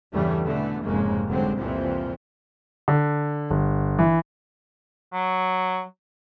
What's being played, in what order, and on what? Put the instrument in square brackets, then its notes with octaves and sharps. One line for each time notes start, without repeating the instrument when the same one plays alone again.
[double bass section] E2 G2 C#3 E3 G3 A3
B2 D3 E3 A3 B3
F1 F2 G#2 C#3 G#3 A#3
G1 D3 F#3 G#3 C4
C2 F2 A#2 E3 F3 C4
[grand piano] D3
G1
E3
[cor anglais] F#3